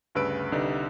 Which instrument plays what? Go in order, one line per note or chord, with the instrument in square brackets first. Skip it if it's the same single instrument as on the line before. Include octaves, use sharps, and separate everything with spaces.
[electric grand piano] D2 G2 C#3 B4 E6 D7
C2 D3 G3 D#4 B4